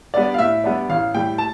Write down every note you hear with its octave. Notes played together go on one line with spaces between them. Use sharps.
G3 B3 D4 D5
F5
A2 E5
G3 B3 D4
A1 F5
A2 G3 G5
A5